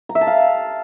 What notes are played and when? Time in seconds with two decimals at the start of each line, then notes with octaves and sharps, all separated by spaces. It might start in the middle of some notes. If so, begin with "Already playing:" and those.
0.09 A#5
0.15 E5
0.21 A5
0.27 F5